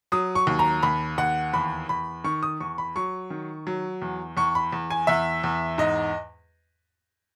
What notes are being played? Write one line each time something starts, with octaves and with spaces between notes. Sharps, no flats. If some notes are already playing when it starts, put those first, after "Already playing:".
F#3 D#6
C#6
D#2
A#5
D#2 B5
D#2 F#5
E2 B5
E2 B5
D#3 C#6
D#6
E2 C#6
B5
F#3 C#6
D#3
F#3
E2
E2 C#6
B5
E2
G#5
E2 E5
E2
G#2 D#5